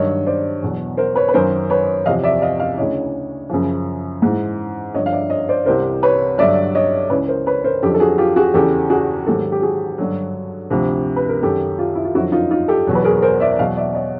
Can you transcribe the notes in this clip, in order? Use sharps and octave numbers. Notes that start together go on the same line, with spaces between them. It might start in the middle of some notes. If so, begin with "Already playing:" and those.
Already playing: G2 D#3 F#3 C#5 D#5
C5 D5
E2 B2 F#3
A#4 C5
B4 C#5
B4
F#2 D#3 F#3 A#4 C5
B4 C#5
E2 C3 F3 D#5 F5
D5 E5
D#5 F5
D#5 F5
D2 C#3 E3 C#5 D#5
F#2 C#3 F3
G#2 E3
G2 D3 F3 C#5 D#5
F5
D5 E5
C#5 D#5
C5 D5
C2 C3 E3 A#4 C5
B4 C#5
G2 D3 F#3 D5 E5
C#5 D#5
C#2 C#3 E3 B4 C#5
A#4 C5
B4 C#5
A#4 C5
F2 D3 F#3 G4 A4
A4
F#4 G#4
F4 G4
F#4 G#4
E2 C#3 E3 G4 A4
F#4 G#4
G#2 D#3 F#3 G4 A4
G4
F#4 G#4
G2 D3 F#3
D2 C3 F3
B4
A#4
F#2 D#3 F#3 G4 A4
F4 G4
E4
F4
F2 D3 F#3 E4 F#4
D#4 F4
D#4 F4
G4 A4
E2 B2 F#3
B4
G#4 A#4
A#4 C5
D5 E5
E2 B2 F#3 D#5 F5
D5 E5
C#5 D#5